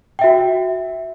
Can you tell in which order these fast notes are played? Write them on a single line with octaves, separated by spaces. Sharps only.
G5 E5 F#4